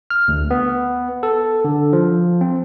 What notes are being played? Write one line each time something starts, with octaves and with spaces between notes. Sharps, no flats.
F6
D2
B3
A4
D3
F3
C4